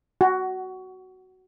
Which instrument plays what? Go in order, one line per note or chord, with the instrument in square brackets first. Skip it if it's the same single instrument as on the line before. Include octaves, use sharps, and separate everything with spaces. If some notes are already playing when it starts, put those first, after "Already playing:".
[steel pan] F#4